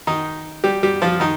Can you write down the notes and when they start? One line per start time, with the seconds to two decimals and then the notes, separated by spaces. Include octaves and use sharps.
0.07 D#3 D#4
0.64 G3 G4
0.83 G3 G4
1.02 F3 F4
1.20 D#3 D#4